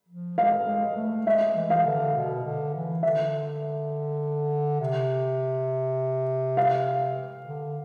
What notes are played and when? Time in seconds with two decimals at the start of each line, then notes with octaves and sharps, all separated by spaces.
0.08 F3
0.38 G#3 F5
0.68 G#3
0.96 A3
1.26 G#3 E5
1.56 E3
1.70 F5
1.85 D3
2.15 B2
2.44 D3
2.74 E3
3.03 D3 E5
4.80 C3
6.57 F5
7.46 D3